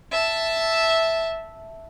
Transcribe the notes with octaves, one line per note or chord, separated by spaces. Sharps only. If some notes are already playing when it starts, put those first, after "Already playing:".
E5 A5